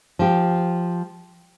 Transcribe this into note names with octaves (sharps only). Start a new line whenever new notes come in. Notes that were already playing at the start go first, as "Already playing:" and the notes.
F3 G4